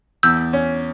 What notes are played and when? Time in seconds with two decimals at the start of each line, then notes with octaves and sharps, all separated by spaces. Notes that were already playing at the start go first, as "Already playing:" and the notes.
0.23 E2 E6 G6
0.53 C#4